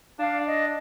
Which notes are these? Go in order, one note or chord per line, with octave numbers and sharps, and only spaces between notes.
D4 F5
D#5